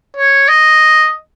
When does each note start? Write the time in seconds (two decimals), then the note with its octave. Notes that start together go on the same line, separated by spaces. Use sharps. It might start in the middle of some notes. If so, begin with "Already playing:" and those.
0.17 C#5
0.48 D#5